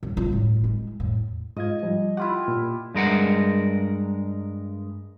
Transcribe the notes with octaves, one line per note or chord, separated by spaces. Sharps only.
F#2
D#1 F4
A2 D#3
G#3 E4
E2 A2
G#2 F4 D#5 G#6
F3 G3
E4 F4 G4 F#5 B5
A#2
G2 G#3 A#4 F#5